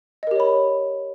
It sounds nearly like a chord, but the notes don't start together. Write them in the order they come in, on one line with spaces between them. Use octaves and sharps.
D#5 A#4 G4 C#5 B5